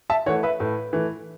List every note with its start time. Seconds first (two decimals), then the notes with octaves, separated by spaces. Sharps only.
0.10 E5 A5
0.26 E3 A3 C#5 F#5
0.43 B4 E5
0.60 A2 B4
0.93 E3 A3